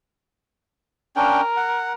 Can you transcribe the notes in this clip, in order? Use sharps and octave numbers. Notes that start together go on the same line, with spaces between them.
C#4 D4 A#4 G5
F#5